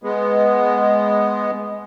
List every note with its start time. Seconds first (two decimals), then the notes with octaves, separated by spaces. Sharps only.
0.04 G#3 B3